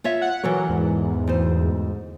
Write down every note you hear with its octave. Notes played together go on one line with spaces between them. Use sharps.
F4 C#5 E5
F#5
E3 F#3 A4 A#4
E2 G#2
D2 C5